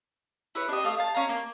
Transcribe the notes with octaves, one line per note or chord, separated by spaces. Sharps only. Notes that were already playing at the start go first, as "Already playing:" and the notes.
E4 B4 C#5
D4 G4 D#5
A3 F5 D#6
F5 A5
C#4 F5 A#5
A#3